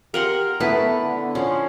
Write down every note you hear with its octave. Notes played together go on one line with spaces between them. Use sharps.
G4 A#4 F#5 C6
A3 B3 E4 B4 A5
D3
F3 C#4